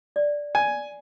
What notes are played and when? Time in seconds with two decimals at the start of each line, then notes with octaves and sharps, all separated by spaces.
0.16 D5
0.55 G#5